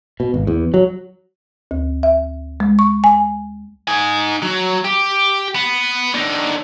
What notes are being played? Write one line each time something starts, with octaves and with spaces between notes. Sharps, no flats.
B2
G#1
E2
F#3
D2
E5
G#3
C#6
G#5
D#4 G#5
F#3
G4
B3
D3 D#4